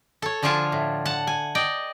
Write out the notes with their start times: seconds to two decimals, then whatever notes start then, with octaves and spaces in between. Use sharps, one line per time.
0.22 A4 C#5
0.43 D3 F3 D4 F4 G#5 A5
0.72 A2
1.05 F#5 A5
1.27 G#5
1.55 D5 D#5 G5